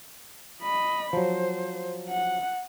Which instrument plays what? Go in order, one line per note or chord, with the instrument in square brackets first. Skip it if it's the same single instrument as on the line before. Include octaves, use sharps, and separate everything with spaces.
[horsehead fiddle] D#5 B5
[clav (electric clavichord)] F3 F#3 [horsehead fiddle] C5
[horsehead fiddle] F#5